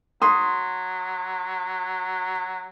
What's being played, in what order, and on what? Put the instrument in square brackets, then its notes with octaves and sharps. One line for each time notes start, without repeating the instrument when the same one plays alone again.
[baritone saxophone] F#3 [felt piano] C6 D#6